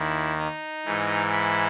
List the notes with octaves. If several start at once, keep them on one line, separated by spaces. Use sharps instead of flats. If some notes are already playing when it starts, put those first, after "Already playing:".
Already playing: D#2 D#3 E4
D#4
G#2 E3
E4